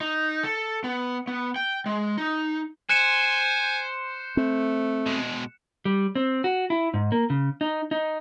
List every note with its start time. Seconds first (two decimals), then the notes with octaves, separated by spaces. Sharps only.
0.01 D#4
0.43 A4
0.84 B3
1.28 B3
1.56 G5
1.86 G#3
2.17 D#4
2.89 C5 G#5 F#6 C#7 E7
4.37 A3 C4
5.06 B2 G#3
5.85 G3
6.15 C4
6.44 F#4
6.70 E4
6.94 G#2
7.12 A#3
7.30 C#3
7.61 D#4
7.91 D#4